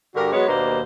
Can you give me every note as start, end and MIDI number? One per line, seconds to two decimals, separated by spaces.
0.15 0.31 43
0.15 0.31 50
0.15 0.31 66
0.15 0.31 67
0.15 0.31 70
0.33 0.47 54
0.33 0.47 56
0.33 0.47 59
0.33 0.47 73
0.48 0.81 39
0.48 0.81 47
0.48 0.81 58
0.48 0.81 62
0.48 0.81 72